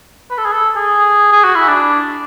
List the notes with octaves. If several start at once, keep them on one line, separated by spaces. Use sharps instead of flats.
B4
A4
G#4
A4
G#4
G#4
F#4
E4
D4